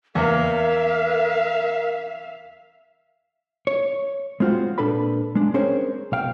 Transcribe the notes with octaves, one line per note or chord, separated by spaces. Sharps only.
E2 A#3 A#4 E5 F5
C#5
G#3 C4 F4 F#4 C5
A#2 D4 A4 B4 B5
G#3 D4
C4 C#4 G#4 A#4 C5 C#5
B1 F5 G5